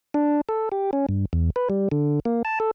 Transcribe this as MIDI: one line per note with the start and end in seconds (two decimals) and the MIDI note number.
0.14 0.41 62
0.49 0.69 69
0.72 0.91 67
0.93 1.06 61
1.09 1.25 43
1.33 1.50 40
1.56 1.69 71
1.70 1.89 55
1.92 2.20 50
2.25 2.43 58
2.45 2.59 81
2.60 2.71 69